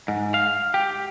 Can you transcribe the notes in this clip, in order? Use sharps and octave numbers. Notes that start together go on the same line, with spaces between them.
G#2
F5
G4